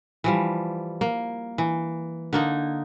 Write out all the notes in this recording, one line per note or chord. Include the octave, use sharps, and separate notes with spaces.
E3 F3 G3
A#3
E3
D3 A#3 D#4